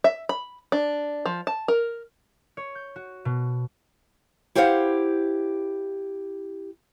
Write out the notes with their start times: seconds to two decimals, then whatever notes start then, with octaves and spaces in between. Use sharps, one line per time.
0.04 E5
0.29 B5
0.72 D4
1.26 F3
1.47 A5
1.68 A#4
2.57 C#5
2.75 G6
2.96 F#4
3.25 B2
4.55 E4 G4 C5 C#5 F5 F#5